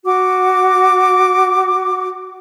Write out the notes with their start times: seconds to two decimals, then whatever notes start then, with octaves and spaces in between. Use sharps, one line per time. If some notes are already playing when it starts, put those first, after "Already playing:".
0.05 F#4 D6